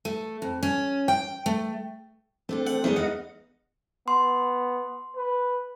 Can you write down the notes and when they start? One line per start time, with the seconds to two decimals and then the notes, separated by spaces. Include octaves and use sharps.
0.05 A3
0.42 F2
0.63 C#4
1.08 G5
1.46 A3
2.49 A3 C4 D4 A4
2.67 F#5
2.84 E2 G#3 B3 D#4
2.96 E4 D#5 F5 F#5
4.08 B3 C6
5.17 B4